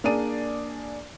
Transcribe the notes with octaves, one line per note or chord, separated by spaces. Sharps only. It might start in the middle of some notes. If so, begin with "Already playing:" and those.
A#3 D4 G#4 D5 D#7